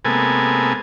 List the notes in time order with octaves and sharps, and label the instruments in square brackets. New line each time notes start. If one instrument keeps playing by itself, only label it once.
[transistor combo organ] C3 G#3 A#3 B3 A4 G#5